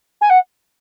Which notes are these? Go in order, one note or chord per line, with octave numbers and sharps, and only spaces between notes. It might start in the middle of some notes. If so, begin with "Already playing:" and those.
G#5
F#5